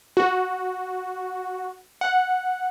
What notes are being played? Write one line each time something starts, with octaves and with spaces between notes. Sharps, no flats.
F#4
F#5